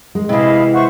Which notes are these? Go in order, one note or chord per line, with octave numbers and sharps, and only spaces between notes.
G#3
C3 E3 E4 G#4 D#5 F5
C5 E5 F#5 C#6